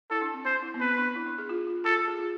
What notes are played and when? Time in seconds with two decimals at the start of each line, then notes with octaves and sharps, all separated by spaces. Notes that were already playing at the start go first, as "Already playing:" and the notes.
0.10 E4 A4
0.22 D4
0.34 C4
0.45 C4 C5
0.62 E4
0.74 B3
0.80 C4 B4
0.97 D4
1.16 E4
1.26 D4
1.38 G#4
1.49 F4
1.67 F4
1.85 F4 A4
1.96 F4
2.08 G#4
2.19 F4